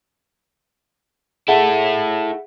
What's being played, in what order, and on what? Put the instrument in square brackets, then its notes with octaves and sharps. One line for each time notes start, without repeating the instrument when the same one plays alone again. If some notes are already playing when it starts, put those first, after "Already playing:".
[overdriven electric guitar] E4 A4 [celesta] G#4 E5 F#5